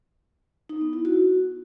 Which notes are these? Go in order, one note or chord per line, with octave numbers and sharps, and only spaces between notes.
D#4
B3
E4
F#4